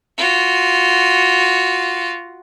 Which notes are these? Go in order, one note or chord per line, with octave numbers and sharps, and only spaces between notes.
F4 F#4